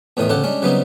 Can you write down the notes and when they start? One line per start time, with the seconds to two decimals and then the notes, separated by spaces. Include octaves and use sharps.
0.17 E2 A2 D#3 E3 D#6
0.29 D2 C#3 G4 A4 F#5
0.44 G3 G#3 C#4 D4
0.62 C#3 F#3 G3 B3 C4 D#4